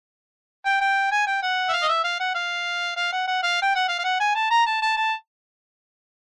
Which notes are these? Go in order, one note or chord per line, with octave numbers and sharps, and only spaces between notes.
G5
G5
G#5
G5
F#5
E5
F5
D#5
E5
F5
F#5
F5
F5
F#5
F#5
F5
G5
F#5
F5
F5
F#5
G#5
A5
A#5
A5
A5
A5